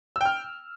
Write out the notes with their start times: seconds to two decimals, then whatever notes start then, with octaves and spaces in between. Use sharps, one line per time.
0.16 E6
0.21 G5
0.26 F6